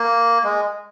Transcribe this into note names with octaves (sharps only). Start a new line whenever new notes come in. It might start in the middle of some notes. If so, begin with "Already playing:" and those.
Already playing: A#3
G#3